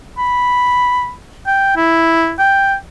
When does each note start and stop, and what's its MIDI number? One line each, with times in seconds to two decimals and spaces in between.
0.18 1.12 83
1.47 1.75 79
1.76 2.33 64
2.39 2.75 79